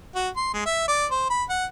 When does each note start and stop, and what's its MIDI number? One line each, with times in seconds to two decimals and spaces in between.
0.15 0.29 66
0.36 0.52 84
0.53 0.63 56
0.66 0.85 76
0.88 1.06 74
1.11 1.28 72
1.30 1.44 83
1.49 1.65 78